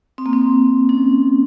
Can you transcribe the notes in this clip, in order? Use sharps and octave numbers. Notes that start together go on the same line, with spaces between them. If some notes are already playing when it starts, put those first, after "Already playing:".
C4
A#3
C4
C#4